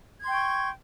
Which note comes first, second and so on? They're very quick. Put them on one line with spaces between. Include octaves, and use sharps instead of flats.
G#6 C6 G5 C#6